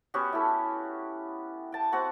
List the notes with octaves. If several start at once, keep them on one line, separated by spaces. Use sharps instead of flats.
B3 C#4 F#4 G4
E4 A4
G5 A5
C4 F#4 F#5